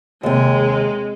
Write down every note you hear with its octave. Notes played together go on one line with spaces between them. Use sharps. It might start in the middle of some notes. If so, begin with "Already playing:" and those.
D#2 C3 G#3